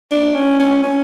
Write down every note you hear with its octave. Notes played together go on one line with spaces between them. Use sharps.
D4
C#4
C#4
C#4